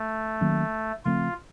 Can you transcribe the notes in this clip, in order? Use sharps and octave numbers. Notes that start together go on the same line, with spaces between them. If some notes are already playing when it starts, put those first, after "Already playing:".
Already playing: A3
D#3 F#3 A#3 C#4
C#3 F3 A3 C4 F4